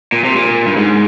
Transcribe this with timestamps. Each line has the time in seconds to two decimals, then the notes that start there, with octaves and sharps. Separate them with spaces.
0.12 A#2
0.24 C3
0.36 A#2
0.66 G2
0.77 G#2